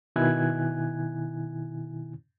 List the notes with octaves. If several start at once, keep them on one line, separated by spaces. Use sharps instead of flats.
B2 D#3 E4 G#5 F#6 G#6